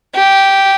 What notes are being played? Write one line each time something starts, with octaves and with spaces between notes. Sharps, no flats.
G4